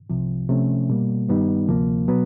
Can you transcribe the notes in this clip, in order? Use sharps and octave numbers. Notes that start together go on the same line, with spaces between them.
C2 C3 F3
C3 F3 A3 C#4
B2 G3 A#3
G2 D#3 G3 B3 D#4
D2 C3 F3 A#3
B2 F#3 B3